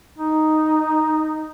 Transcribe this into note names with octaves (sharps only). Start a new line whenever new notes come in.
D#4